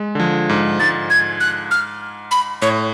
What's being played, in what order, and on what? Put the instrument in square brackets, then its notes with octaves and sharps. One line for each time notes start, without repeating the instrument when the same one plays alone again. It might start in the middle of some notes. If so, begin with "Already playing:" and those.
Already playing: [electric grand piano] G#3
D3
F3
G#2
[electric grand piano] G#2 [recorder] A6
[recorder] G#6
F#6
F6
B5
[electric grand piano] A2 [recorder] C#5